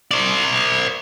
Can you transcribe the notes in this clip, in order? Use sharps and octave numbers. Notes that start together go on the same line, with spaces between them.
C5 D5